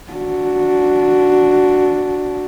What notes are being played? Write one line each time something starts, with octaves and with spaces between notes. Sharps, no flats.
D4 F#4